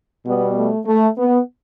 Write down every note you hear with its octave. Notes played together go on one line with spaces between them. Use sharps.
B2 G3 B3
A3
A3
B3